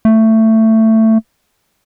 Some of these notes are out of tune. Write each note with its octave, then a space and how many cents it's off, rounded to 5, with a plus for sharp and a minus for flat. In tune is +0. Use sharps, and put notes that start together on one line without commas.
A3 +15